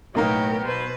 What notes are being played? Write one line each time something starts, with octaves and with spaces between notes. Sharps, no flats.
B1 A2 A#3 B3 D#4 G4 A#4 C#5
B2 B4 C5